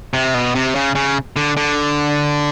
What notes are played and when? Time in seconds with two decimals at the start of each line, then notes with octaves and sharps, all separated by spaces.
0.14 C3
0.34 B2
0.55 C3
0.75 C#3
0.95 C#3
1.36 D3
1.57 D3